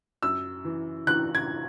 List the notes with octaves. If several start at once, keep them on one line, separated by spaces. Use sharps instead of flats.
F#2 E6
E3
E3 F#6
G#6